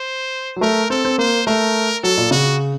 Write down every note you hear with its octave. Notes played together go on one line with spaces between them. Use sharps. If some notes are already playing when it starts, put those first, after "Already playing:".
Already playing: C5
F#3
A3 A#4
C4 A4
C4
A#3 C5
A3 A#4
F#3 A4
A#2
C#3 F#4